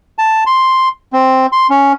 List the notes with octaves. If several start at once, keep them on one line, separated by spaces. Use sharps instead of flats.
A5
C6
C4
C6
C#4